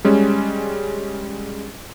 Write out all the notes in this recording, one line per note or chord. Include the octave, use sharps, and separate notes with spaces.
G3 G#3 C#4